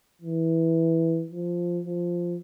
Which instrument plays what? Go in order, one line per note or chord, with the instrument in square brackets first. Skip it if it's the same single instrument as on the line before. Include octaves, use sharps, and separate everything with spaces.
[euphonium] E3
F3
F3